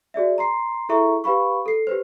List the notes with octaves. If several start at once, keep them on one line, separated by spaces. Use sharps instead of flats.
F#4 G#4 D5 E5
A#5 C6 C7
E4 G#4 A4 E5 A#5 C#6
G4 B4 F5 B5 C#6
A4 C7
G4 B4 C5